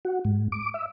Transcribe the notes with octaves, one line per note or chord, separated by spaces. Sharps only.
F#4
G#2
D6
E5